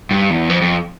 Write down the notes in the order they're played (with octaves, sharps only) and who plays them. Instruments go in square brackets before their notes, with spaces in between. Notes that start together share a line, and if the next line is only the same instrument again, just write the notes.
[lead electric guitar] G2
E2
F2
F2